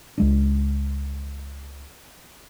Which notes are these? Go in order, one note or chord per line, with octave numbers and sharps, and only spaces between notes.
C#2 G#3 D4